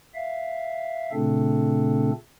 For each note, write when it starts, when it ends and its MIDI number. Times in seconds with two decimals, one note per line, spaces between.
0.15 1.12 76
0.15 1.12 77
1.13 2.11 46
1.13 2.11 49
1.13 2.11 57
1.13 2.11 60
1.13 2.11 62
1.13 2.11 69